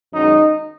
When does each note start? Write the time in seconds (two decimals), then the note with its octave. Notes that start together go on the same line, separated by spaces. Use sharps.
0.13 F#2 D#3 G#3 D#4